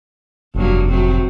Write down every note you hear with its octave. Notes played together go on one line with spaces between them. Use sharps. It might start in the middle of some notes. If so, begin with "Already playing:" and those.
F1 G2 F#3 A#3
A2 F#3 C4